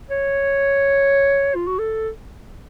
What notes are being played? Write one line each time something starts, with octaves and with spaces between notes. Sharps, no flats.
C#5
F4
F#4
A4